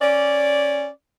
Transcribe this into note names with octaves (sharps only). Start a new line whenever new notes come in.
C#4 D5